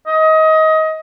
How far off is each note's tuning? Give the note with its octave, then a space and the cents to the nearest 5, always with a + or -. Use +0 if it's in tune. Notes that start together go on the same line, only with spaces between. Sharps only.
D#5 +25